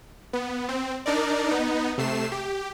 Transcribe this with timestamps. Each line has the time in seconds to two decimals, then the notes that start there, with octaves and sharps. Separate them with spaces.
0.33 B3
0.69 C4
1.06 D4 D#4 A#4 D5
1.49 B3 D#4
1.98 C3 A3 C7 E7
2.32 G4